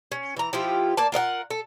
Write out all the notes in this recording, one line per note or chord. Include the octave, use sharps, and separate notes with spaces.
C#4
E3 A#5
F3 E4 F4 G4
A#3 D5 A5
F4 A#4 D#5 F#5
A4